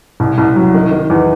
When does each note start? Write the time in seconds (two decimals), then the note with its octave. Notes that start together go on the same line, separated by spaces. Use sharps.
0.20 C2
0.38 C2
0.56 F#3
0.74 D#3
0.91 D#3
1.10 E2